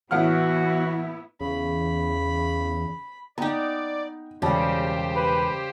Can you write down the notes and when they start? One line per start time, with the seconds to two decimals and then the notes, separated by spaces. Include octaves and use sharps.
0.11 A2 E3 B3 E4 F#4 F#5 F6
1.41 E2 C#3 B5
3.38 B3 D#4 D5 G5 A#5
4.42 E1 C#3 G3 G4 C5 A5
5.16 B4